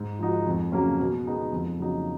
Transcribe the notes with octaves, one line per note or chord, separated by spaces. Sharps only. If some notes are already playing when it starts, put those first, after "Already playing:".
Already playing: G#2
F3 G#3 D#4 F#4
F2
C#3 F#3 A#3 C#4
B2
G#3 B3 D#4 G#4
F2
C#3 F#3 A#3 D#4